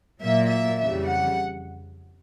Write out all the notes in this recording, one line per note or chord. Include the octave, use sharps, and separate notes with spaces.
A#2 F#3 A#3 E5
E5
F2 C#3 E3 G3 E5
F#5